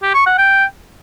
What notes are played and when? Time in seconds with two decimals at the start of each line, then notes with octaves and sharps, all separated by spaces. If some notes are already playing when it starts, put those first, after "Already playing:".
0.02 G4
0.14 C#6
0.26 F#5
0.38 G5